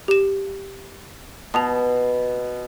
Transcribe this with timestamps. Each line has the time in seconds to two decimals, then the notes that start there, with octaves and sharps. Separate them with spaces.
0.08 G4 E7
1.54 B2 A5 D#6 F7